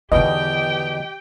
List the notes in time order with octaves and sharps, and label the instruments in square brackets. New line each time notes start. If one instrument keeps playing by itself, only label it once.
[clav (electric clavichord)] E2 B2 [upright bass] D3 D#3 [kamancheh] G4 G5 [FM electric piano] D#5